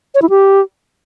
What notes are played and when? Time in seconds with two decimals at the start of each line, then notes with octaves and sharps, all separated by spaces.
0.15 C#5
0.22 E4
0.30 G4